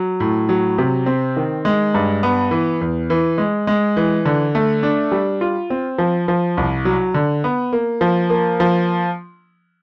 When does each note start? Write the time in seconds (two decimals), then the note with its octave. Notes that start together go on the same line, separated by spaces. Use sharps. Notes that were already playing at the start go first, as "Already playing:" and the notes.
Already playing: F#3
0.20 A2
0.49 F#3
0.78 C3
1.06 C4
1.37 D#3
1.65 G#3
1.94 G2
2.23 B3
2.51 E3
2.81 E2
3.10 E3
3.38 G#3
3.67 G#3
3.97 E3
4.25 D3
4.55 A3
4.83 D4
5.12 G3
5.41 F4
5.70 C4
5.98 F3
6.28 F3
6.57 C2
6.85 F#3
7.14 D3
7.44 B3
7.73 A#3
8.01 F3
8.30 A#3
8.60 F3